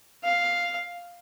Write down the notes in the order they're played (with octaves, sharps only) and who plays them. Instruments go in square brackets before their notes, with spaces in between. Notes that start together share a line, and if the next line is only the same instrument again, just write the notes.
[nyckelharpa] F5